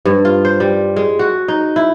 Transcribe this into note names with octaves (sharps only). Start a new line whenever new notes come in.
G2
F4
C5
G3
G#3
F#4
D#4
E4